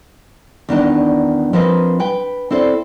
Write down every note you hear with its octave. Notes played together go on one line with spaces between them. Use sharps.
E2 D#3 D4 D#4
F3 C4 A#4 B4 D5 D#5
B4 G5
C4 E4 A4 B4 C5 D5